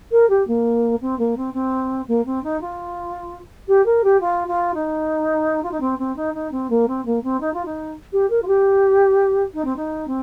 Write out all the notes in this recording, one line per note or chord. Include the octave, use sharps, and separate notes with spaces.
A#4
G4
A#3
C4
A#3
C4
C4
A#3
C4
D#4
F4
G4
A#4
G4
F4
F4
D#4
F4
D#4
C4
C4
D#4
D#4
C4
A#3
C4
A#3
C4
D#4
F4
D#4
G4
A#4
F4
G4
D#4
C4
D#4
C4